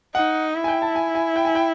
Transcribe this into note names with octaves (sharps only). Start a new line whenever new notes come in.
D#4 F#5
E4
G#5
G5
A5
G#5
G#5
G5
G#5
G5